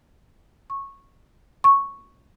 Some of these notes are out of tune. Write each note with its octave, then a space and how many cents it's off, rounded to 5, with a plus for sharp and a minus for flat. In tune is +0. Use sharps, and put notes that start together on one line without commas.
C#6 -10
C#6 +0